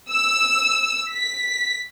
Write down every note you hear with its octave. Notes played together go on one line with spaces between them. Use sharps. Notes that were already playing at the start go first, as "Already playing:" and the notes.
E6
B6